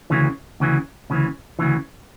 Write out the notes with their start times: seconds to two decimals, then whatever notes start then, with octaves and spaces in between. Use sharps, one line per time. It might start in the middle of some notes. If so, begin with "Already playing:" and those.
0.10 D2 C#3 E3
0.60 D2 C#3 E3
1.10 D2 C#3 E3
1.59 D2 C#3 E3